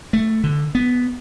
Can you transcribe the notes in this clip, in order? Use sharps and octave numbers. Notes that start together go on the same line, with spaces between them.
A3
D3
B3